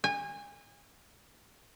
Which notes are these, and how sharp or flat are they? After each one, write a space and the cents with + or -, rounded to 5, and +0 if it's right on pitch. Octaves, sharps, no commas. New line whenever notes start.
G#5 -30